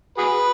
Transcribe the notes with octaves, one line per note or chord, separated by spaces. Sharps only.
F#4 G#4 B4